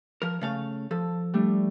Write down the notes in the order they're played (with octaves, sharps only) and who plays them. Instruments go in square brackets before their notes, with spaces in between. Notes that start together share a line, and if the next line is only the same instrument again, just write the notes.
[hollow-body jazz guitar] F3 A#4
C#3 A3 F5
[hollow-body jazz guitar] F3 [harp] A4
[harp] G3 A3 D4